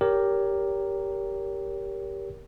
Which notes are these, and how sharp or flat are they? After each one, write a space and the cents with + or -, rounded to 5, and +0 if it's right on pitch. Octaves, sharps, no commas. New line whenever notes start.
G4 +0 A#4 +0 C#5 +30